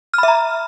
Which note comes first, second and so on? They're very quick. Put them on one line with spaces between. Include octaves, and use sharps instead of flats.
F6 B5 E5 A#5